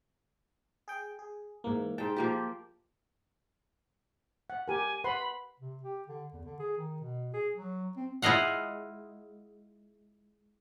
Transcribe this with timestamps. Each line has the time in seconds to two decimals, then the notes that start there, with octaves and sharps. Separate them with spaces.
0.88 G#4 G5
1.19 G#4
1.64 G#2 E3 A#3
1.98 G#2 G5 A5
2.16 F3 A#3 G4
4.50 F#5
4.68 G4 A#4 G#5
5.04 B4 F#5 B5 C6
5.60 C3
5.83 G4
6.08 D3
6.33 E2
6.45 D3
6.60 G#4
6.78 D#3
7.01 B2
7.33 G#4
7.56 F#3
7.97 C4
8.22 G#3 E4 F4 D#5 F5 F#5